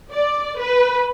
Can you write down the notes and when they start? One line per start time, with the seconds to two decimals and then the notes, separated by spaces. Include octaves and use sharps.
0.11 D5
0.58 B4